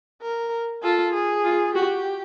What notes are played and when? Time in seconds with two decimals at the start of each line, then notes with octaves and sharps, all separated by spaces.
0.22 A#4
0.83 F4 A4
1.14 G#4
1.44 F4
1.75 F#4 G4